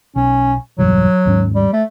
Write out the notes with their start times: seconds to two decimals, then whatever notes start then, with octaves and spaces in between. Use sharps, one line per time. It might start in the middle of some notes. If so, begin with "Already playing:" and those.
0.16 B1 C#4
0.78 B1 E2 G2 F#3
1.25 D#2 G#2 C#4
1.55 G3
1.73 A3